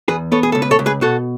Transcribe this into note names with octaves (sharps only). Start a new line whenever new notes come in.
E2 G#4 B4
B3 A4 C#5
G#4
C#2 A4
B4
A4 C#5
C#2
G#4 B4
B2 F#4 A4